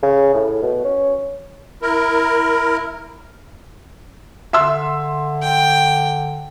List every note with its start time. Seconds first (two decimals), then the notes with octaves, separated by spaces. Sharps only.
0.03 C#3
0.34 A2
0.63 B2
0.85 C#4
1.82 E4 A#4
4.53 D3 E5 C6 E6
5.42 G5